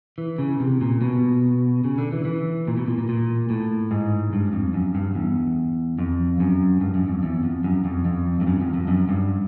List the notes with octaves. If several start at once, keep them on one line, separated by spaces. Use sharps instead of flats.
E3
C#3
C3
A#2
B2
C#3
D3
E3
E3
A#2
B2
A#2
A#2
A#2
A2
G#2
G2
F2
F#2
G2
E2
F2
F#2
G2
F#2
F2
E2
F2
F#2
F2
F2
G2
F#2
F2
F2
F#2
G2